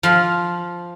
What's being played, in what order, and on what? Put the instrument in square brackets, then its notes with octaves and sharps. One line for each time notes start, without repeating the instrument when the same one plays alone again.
[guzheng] F3 F4 C6